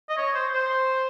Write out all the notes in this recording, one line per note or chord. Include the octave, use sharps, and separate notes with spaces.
D#5
C#5
C5
C5